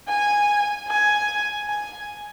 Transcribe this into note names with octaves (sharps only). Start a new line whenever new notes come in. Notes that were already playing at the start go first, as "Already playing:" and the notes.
G#5
G#5
G#5